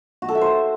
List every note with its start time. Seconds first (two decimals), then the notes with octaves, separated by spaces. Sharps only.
0.22 F#4
0.29 A4
0.35 E5
0.41 C5